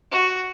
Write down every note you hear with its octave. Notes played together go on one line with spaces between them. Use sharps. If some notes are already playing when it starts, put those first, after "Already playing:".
F#4